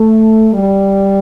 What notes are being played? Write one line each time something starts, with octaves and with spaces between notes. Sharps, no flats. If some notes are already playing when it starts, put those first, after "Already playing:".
Already playing: A3
G3